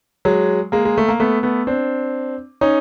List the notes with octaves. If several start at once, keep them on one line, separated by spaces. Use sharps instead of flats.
F#3 G#3
G#3 A#3
G#3
A3
A#3
A3 B3
A3 B3
C4 D4
C#4 D#4